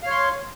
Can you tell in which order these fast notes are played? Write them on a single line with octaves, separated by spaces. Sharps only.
F5 C#5 C6